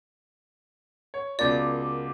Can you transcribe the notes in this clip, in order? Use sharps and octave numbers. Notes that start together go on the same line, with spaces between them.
C#5
C#2 B2 F4 A#4 D5 D6